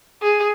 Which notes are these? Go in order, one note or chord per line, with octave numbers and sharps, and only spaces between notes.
G#4